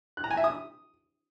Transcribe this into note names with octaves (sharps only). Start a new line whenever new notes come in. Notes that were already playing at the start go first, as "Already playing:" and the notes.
F#6
A#5
G#5
E5
D#6